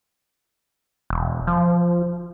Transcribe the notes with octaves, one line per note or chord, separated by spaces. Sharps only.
E1
F3